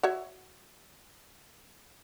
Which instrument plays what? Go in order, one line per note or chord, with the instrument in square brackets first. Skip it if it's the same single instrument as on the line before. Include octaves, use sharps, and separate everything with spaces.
[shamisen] F#4 C#5 E5